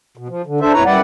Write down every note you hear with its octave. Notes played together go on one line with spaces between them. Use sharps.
B2
F3
D3
D4 A4 C5 E5
F2 A#2 E4 B4 C#5 A#5
F#2 G3 E4 B4 D5 F#5